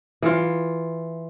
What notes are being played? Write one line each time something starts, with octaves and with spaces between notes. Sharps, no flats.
E3 F4